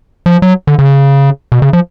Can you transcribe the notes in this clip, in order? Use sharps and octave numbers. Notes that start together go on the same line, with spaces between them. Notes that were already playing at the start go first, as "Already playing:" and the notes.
F3
F#3
D3
C#3
B2
C#3
F3